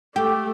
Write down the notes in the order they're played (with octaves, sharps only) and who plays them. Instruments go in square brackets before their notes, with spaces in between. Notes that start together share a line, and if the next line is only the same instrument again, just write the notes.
[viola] A3 [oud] G4